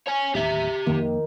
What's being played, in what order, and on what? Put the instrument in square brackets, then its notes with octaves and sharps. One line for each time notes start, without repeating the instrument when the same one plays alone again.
[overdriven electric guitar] C#5 G#5
[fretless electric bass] D1 D#2 [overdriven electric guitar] G4 E5
[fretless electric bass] F2 A#3 [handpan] D#3